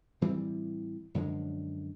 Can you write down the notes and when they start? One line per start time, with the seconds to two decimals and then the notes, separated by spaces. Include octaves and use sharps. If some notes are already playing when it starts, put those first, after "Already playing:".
0.21 A2 E3 G3 C4
1.14 F#2 D3 F3 G#3